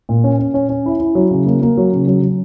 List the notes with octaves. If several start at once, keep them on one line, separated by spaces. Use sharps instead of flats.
A#2
C#4
C#4
C#4
C#4
E4
E4
F#3
C#3
A#3
A#3
F#3
C#3
F#3
F#3